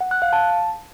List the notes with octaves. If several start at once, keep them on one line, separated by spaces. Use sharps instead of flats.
F#5
F#6
F5
A5